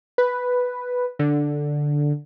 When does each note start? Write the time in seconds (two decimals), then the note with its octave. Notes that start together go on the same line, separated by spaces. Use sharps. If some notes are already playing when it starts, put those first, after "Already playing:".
0.18 B4
1.19 D3